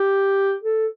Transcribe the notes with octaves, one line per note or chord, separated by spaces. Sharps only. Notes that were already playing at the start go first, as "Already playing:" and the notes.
Already playing: G4
A4